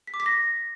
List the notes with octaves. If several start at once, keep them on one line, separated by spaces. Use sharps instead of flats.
B6
D6
B6
A#6